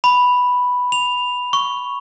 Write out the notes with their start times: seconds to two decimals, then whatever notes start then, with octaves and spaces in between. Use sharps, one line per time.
0.04 B5
0.92 F7
1.53 C#6